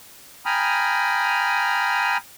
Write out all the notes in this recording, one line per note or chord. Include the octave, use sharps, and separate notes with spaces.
G5 G#5 A#5 B5 D#6 F6